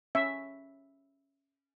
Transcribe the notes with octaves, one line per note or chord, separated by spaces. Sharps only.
C#4 E5